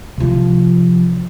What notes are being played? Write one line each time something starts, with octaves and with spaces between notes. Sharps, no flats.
C3 F3